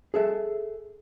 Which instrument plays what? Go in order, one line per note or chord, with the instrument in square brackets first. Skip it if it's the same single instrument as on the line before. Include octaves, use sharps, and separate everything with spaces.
[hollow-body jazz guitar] G#4 A4 E5